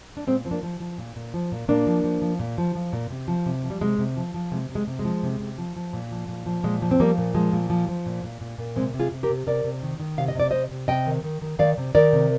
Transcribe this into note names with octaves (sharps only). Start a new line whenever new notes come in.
D4
A#2 G#3 C4
F3 C4
A#3 D4
F3
F3
A#2
A#2
F3
A#2
A#2 A#3 D4
F3
F3
F3
A#2
F3
F3
A#2
C3
F3
C3
F3
G3
C3 G#3
C3
F3
F3
C3 G#3
C3
G#3
C3
G#3
F3
C3
C3
F3
F3
A#2
F3
A#2
F3
A#2 G#3
F3
C4
F3 G3 A#3
A#2
F3 G#3
A#2
F3
F3
A#2
A#2
A#2
A#2
C3 G#3 C4
C3
F4 G#4
C3
G4 A#4
C3
C3 A#4 D5
C3
D#3
D#3
C3 F5
D#5
C3 D5
C3 C5 D#5
C3
C3 D#5 G5
D#3
D#3
D#3
D#3 D5 F5
C3
D#3 A#4 D5
C3